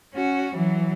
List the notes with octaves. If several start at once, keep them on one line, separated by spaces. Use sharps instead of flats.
C#4 F#4
E3 F#3